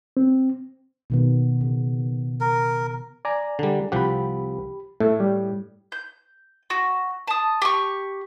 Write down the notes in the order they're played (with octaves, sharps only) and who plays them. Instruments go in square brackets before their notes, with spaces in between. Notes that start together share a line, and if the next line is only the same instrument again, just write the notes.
[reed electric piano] C4
[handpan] B2 D#3 B3
C#3
[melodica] A#4
[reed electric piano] D5 G#5 A#5
[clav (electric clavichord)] D3 G3
[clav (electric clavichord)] C2 F3 F#5 [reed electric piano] G4 B5
[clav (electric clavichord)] A2 [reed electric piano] A3
[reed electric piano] G3
[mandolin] G6
F#4
A5 D#6
G4 C#6